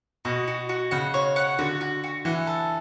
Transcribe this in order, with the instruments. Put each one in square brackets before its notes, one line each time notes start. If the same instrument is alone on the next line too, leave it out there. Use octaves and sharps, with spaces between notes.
[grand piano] B2 [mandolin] F#4
[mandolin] F#4
F#4
[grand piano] C#3 [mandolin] F#5
[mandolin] C#5
F#5
[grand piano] D3 [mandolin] F#4
[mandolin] F#4
F#4
[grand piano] E3 [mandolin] F#5
[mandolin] A4